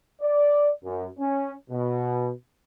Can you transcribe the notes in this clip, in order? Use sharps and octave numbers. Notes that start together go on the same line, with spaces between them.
D5
F#2
C#4
B2